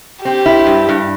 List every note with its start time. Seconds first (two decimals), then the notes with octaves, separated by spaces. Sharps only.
0.24 C4 G4
0.46 E4
0.66 G2
0.89 G2